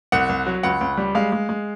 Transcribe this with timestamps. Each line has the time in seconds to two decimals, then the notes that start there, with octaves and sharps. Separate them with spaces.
0.12 C2 F#5
0.29 C2
0.46 F#3
0.63 C#2 F#5
0.81 C#2
0.97 G3
1.15 G#3 F5
1.32 G#3
1.49 G#3